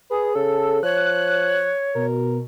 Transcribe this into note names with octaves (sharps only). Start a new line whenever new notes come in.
G#4 B4
C#3 A4
F3 C#5 F#6
B2 A#4